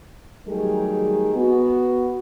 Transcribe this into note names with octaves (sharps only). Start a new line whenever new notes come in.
D#3 F#3 G3 A3 G#4
B3 F#4